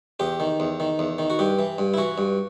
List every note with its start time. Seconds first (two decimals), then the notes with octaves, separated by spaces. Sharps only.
0.20 E2 G4
0.40 D#3
0.60 E2
0.80 D#3
0.99 E2
1.18 D#3
1.30 F#4
1.39 G2 G4
1.59 E3
1.78 G2
1.94 E4
1.98 E3 F#4
2.18 G2